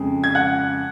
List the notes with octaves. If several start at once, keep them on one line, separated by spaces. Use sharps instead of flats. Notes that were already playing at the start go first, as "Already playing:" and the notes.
Already playing: F2 C#3 G#3
G#6
F#5 F#6